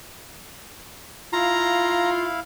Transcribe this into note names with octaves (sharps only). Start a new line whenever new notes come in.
E4 F4 F5 A#5